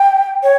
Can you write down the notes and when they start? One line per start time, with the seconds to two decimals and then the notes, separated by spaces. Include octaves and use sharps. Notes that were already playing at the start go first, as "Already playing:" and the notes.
Already playing: G5
0.43 C#5